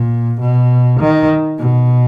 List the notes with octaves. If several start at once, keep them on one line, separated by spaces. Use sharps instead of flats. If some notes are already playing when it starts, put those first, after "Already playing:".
Already playing: A#2
B2
D#3
B2